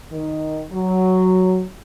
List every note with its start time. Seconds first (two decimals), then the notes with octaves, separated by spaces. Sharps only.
0.11 D#3
0.72 F#3